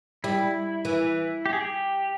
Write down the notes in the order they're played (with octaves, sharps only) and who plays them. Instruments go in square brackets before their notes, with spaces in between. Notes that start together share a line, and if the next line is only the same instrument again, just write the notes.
[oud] G3 [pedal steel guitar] E4
[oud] E3
[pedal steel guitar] G4
G#4
G4